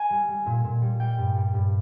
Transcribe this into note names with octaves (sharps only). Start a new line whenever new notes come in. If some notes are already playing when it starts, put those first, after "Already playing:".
Already playing: G#5
G3
G3
A#2
A#2
G3
G3 G5
G2
G3
G2